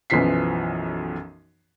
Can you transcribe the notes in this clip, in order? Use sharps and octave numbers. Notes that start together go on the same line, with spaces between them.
B1 F#2 E3 F3 B6 C7